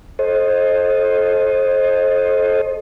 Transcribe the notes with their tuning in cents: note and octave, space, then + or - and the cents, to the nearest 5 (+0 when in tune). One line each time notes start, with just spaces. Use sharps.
A4 -20 C5 +25 D#5 +0